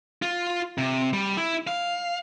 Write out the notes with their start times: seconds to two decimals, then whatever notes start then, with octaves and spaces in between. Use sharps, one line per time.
0.22 F4
0.78 C3
1.13 G3
1.37 E4
1.67 F5